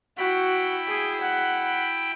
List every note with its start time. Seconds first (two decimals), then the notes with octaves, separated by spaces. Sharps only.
0.18 E4 F#4 G5 B5
0.88 G#4
1.21 F#5